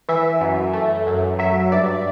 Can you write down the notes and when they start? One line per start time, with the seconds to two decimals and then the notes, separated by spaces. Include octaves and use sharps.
0.09 E3 E5
0.41 F#2
0.73 A3
1.07 F#2
1.39 F#3 E5
1.72 G2 D5